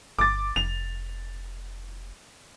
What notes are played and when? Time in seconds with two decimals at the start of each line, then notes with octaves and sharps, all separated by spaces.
0.19 G1 D6 A6
0.56 F1 F7